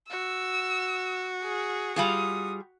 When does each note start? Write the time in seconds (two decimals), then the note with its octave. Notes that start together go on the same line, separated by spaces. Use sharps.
0.10 F#4 E6
1.43 G#4
1.96 G3 F4 G#4 D#6